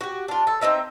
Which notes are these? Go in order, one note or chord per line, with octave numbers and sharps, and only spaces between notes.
F#4 G4
D4 F4
A4
C4 C#4 D#4 E5